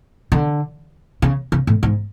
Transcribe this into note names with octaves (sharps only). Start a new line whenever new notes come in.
D3
C#3
C#3
A2
G#2